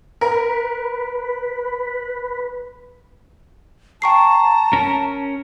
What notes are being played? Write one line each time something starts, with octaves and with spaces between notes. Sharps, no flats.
A#4 B4
G5 A5 A#5 C#6 C7
C#4 A#4